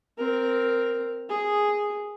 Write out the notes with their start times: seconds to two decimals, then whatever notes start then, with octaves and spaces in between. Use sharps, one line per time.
0.18 C4 A#4
1.29 G#4